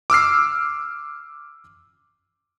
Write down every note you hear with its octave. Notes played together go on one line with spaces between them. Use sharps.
D6 E6 F6 C7